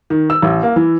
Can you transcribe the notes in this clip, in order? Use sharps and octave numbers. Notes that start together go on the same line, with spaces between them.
D#3
E6
A1
A#3
E3